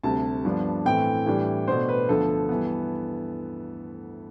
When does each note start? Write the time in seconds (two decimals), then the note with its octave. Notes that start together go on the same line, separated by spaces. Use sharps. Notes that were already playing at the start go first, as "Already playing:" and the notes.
0.04 D2 C3 G3 A5
0.45 G2 F3 B3 D4
0.85 A2 E3 A3 C4 G5
1.26 A2 E3 G3 D4
1.68 B2 A3 D4 C5
1.88 B4
2.08 D2 D3 F3 B3 A4
2.49 G2 E3 B3